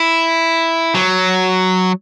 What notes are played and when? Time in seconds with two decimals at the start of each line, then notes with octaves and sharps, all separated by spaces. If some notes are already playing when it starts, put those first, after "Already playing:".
Already playing: E4
0.94 F#3